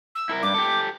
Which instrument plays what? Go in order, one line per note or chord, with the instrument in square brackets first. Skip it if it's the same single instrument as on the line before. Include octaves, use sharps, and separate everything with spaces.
[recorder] E6
[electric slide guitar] E4 A4 A#4
[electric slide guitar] G2 [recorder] D6
[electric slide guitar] G4 A4